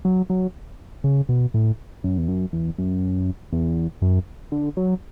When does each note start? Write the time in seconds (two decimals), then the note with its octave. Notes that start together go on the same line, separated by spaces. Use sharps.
0.05 F#3
0.30 F#3
1.04 C#3
1.29 B2
1.54 A2
2.04 F#2
2.18 E2
2.28 F#2
2.53 E2
2.78 F#2
3.53 E2
4.02 F#2
4.52 D3
4.77 F#3